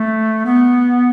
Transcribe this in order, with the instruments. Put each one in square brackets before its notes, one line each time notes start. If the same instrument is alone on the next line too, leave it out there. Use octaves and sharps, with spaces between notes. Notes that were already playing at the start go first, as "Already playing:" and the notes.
Already playing: [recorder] A3
B3